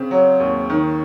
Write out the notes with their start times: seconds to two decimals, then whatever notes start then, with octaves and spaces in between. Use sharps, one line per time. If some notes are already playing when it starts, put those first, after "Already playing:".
Already playing: C#3 C4
0.11 F#3
0.40 D#2
0.70 D#3